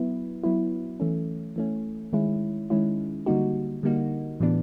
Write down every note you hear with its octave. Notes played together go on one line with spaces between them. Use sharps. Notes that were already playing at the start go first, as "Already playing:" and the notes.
Already playing: F#3 B3 E4
F#3 B3 E4
E3 A3 C#4
E3 A3 C#4
D#3 G#3 C#4 E4
D#3 G#3 C#4 E4
D3 G3 A#3 D#4 F#4
D3 G3 A#3 D#4 F#4
A2 E3 G3 B3 D4